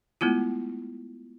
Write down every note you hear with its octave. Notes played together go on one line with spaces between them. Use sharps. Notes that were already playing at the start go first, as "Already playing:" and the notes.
G#3 A3 B3 E4 F4